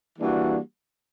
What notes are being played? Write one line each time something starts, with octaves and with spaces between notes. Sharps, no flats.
E3 G3 A#3 D4 F#4